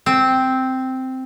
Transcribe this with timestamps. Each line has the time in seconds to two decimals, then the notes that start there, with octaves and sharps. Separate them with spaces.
0.06 C4